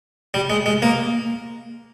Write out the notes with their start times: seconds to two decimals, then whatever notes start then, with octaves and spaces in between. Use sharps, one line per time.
0.34 G3
0.50 G#3
0.66 G#3
0.82 A#3